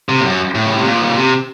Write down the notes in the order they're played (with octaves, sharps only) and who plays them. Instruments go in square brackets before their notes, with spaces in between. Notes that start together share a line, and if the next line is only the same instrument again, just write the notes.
[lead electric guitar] C3
A2
F#2
A2
C#3
C3
A#2
F3
D#3
C#3
C3